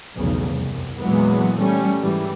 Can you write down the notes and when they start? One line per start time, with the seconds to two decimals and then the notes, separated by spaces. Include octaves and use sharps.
0.16 F1 B1 E2 C#3
0.51 C2 F#2
1.00 E2 A#2 E3 F#3 G#3 B3
1.60 G3 A3 C#4
2.00 G#2 E3 G3